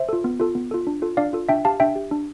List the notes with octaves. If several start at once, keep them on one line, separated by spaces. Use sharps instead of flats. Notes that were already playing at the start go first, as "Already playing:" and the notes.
Already playing: C5 E5
F4 A4
B3
F4 A4
B3
F4 A4
D4
F4 A4
D4 D5 F5
F4 A4
D4 E5 G5
G4 F5 A5
D4 E5 G5
G4
D4